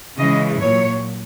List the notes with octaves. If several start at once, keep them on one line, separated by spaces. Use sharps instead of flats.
C#3 E3 G#3 D#5
A#2 F#3 C#5